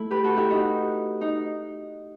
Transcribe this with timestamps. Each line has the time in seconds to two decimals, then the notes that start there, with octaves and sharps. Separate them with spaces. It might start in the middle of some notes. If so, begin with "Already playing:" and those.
Already playing: A3 E4
0.11 G4 B4
0.24 F#4 A4
0.36 E4 G4
0.50 D#4 F#4
1.21 D#4